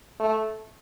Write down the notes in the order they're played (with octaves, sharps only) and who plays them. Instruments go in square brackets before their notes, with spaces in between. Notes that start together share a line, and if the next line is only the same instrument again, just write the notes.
[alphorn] A3